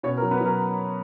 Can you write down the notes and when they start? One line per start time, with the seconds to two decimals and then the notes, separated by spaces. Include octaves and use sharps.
0.03 B2 C#4 C#5
0.17 F#3 A#4
0.31 B3 B4
0.41 F#3 A#4